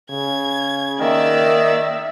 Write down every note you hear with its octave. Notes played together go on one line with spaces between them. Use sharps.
C#3 G#6
D#3 A#3 D5 E5 E6